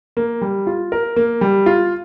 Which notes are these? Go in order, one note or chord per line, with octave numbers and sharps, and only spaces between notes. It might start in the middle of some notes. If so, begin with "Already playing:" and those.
A#3
G3
F4
A#4
A#3
G3
F4